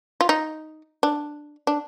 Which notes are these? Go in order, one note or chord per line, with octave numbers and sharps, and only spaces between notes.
F4
D#4
D4
D4